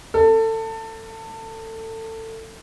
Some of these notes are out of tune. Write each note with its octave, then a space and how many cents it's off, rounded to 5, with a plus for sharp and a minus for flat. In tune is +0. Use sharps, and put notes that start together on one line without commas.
A4 +25